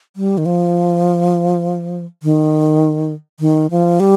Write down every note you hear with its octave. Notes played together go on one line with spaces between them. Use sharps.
G3
D#3
F3
D#3
D#3
F3
G3